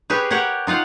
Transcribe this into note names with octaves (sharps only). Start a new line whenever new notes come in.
G4 G#4 B4 C#5
G4 A#4 C#5 F#5
D#4 F4 F5 F#5